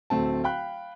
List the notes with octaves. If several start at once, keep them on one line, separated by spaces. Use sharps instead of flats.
D1 A3 C4 A5
F5 G5 B5 F#6